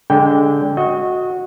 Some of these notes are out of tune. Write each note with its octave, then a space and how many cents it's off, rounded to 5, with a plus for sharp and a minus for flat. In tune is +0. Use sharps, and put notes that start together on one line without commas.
D3 -20 G#3 -15 G5 +0
F#4 -15 D#5 +20